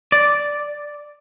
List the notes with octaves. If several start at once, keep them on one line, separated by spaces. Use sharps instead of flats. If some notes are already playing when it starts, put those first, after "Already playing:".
D5